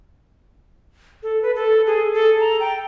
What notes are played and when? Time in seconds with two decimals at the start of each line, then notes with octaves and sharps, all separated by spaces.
1.23 A4
1.42 B4
1.55 A4
1.87 G#4
2.13 A4
2.40 A#5
2.60 G5